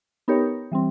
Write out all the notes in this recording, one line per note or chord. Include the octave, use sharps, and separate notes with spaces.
B3 D#4 G4 A#4 C#5
E3 G3 C4